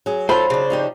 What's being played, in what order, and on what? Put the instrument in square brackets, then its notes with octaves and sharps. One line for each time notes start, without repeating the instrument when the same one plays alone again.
[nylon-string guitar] F#3 G#4
[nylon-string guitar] F#3 D#4 F4 [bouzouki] A4 [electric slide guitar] C5 [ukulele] B5
[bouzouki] C#3 D4
[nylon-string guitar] F3 D#4 G4